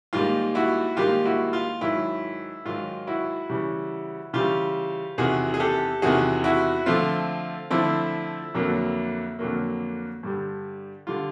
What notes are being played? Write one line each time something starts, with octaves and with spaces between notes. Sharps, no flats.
G#2 D#3 G3 A#3 F4
E4 F#4
G#2 D#3 G3 A#3 F4 G4
E4 F#4
F4
G#2 D#3 F#3 E4
G#2 D#3 F#3 F4
E4 F#4
C#3 E3 G3
C#3 E3 G3 F4 G4
E2 C3 D#3 F#4 G#4
G#4
G4 A4
E2 C3 D#3 F#4 G#4
E4 F#4
D3 F3 A3 C4 F4
D3 F3 A3 C4 E4
F2 D3 F#3 A#3
F2 D3 F#3 A#3
G2 D3 G3
D3 G3 F4